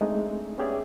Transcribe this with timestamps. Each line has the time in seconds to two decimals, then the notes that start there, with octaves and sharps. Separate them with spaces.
0.01 G#3 A3 C4 D4 D#4
0.58 B3 C#4 G4 G#4 D5 E5